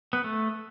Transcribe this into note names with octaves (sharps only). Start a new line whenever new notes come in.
B3
A3